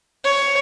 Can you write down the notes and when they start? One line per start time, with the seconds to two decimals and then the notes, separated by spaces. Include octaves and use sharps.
0.24 C#5